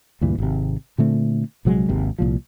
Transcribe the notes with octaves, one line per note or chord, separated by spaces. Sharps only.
D2 G2 A#2 E3
G#1 C3
A#2 D3 A3 C4
A#1 C3 F#3 G#3
G#1 D#2 C3
C2 A#2 F3